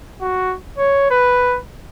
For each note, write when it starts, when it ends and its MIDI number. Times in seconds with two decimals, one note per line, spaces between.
0.21 0.55 66
0.78 1.07 73
1.11 1.58 71